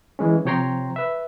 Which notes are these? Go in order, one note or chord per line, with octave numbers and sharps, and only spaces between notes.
E3 G#3 C#4
C3 F3 C#5 G5 A#5 C6
B4 E5